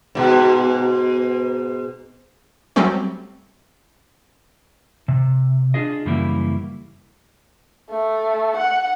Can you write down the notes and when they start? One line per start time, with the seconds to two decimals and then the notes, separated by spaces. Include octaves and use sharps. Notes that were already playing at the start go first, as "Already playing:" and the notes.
0.15 G#2 B2
2.76 F#3 G3 A3 C4 C#4
5.08 C3
5.74 D4 F4 G#4 D#5
6.05 F#2 C#3 E3 G3 A#3 E4
7.91 A3
8.57 F#5